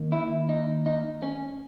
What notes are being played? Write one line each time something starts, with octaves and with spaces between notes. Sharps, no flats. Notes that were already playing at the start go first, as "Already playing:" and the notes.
Already playing: D#2 D#3 A#3
E4
D#4
D#4
C#4